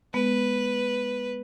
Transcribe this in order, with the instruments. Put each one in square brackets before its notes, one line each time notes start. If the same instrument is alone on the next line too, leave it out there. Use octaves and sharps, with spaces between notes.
[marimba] G#3 B3 [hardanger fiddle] B4